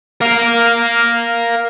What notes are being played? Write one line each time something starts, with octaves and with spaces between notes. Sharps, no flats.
A#4 F5